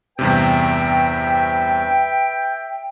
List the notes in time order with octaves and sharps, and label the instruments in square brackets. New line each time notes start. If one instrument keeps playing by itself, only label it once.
[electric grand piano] E2 G2 C3 [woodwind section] B4 E5 G5